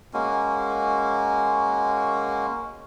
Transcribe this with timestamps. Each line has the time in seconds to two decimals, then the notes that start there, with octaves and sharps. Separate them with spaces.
0.14 G#3 A#3 C#4 F#4